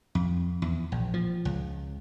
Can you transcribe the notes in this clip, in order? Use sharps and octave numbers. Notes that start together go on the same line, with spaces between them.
F2
E2
A#1
F3
C#2